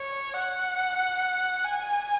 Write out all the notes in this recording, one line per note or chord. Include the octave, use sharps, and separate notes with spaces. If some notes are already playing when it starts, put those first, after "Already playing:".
Already playing: C#5
F#5
G#5